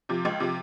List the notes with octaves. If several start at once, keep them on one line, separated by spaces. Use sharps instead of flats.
C3 F3
C#2
C3 F3